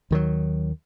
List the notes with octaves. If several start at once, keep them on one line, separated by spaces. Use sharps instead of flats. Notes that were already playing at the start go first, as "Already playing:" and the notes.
D#2 D#3 F#3